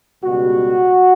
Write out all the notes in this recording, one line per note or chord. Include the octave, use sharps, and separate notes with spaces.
C#2 B2 G3 F#4